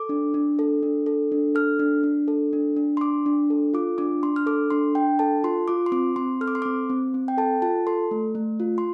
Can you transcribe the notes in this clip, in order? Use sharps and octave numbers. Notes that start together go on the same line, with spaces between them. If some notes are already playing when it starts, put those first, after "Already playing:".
Already playing: A4 D6
D4
D4
A4
D4
A4
D4
A4 F6
D4
D4
A4
D4
D4
C6
D4 D6
D4
A4
F4 D6
D4 D6
D4 C6
F6
A4 D6
D4 C6
D4 G5
A4 A5
F4 C6
F4 D6
C6
C4 D6
C4 C6
A4 F6
D6
C6
C4 D6
C4
C4
G5
A4 A5
F4 A5
A4 C6
A3
A3
F4
C6